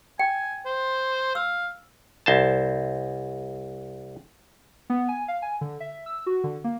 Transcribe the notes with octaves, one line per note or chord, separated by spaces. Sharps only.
G5 G#5
C5
F5 E6
C2 C5 A5
B3
G#5
F5
G#5
D3
E5
E6
F#4
D3
A#3